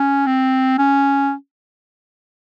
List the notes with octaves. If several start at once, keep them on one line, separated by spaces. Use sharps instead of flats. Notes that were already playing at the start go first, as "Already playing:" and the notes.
Already playing: C#4
C4
C#4